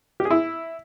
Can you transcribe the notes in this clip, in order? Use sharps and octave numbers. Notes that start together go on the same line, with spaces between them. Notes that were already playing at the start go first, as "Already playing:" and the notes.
G4
G#4
E4